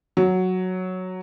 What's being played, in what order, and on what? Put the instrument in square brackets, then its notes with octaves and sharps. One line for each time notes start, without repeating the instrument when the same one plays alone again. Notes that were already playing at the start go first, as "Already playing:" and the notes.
[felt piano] F#3